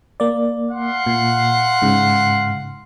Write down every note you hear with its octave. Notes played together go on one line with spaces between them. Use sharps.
A#3 D5
F5 F#5 C6
A#2
G#2 C#3